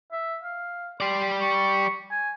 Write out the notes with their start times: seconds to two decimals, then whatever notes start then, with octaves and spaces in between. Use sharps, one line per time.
0.12 E5
0.43 F5
1.00 G4 D5 C6
1.41 C#6
2.11 G#5